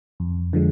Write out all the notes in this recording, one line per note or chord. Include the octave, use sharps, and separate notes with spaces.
F2
D3 F3 G#3